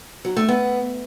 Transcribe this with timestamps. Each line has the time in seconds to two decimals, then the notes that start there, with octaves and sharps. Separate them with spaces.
0.25 F#3
0.37 A3
0.48 B3